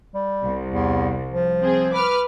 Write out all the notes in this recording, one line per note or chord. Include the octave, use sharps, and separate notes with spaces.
G3
C2
E2
F3
C4 G#4
B4 D6 F6